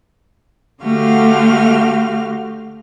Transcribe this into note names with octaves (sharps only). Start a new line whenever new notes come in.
D3 A3 F#4 G4 F5 F6